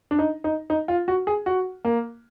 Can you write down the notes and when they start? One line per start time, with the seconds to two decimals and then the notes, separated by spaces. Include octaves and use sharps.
0.11 D4
0.19 D#4
0.44 D#4
0.70 D#4
0.88 F4
1.08 F#4
1.27 G#4
1.46 F#4
1.85 A#3